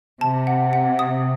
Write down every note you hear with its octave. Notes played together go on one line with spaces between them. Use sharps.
C3 A5
F#5
F#5
D#6